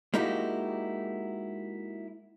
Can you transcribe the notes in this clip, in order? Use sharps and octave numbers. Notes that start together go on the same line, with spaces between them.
G#3 A#3 D#4 E4 F#4 G4